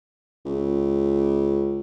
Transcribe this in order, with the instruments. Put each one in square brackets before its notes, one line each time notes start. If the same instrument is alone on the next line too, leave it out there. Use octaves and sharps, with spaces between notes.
[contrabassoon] C#2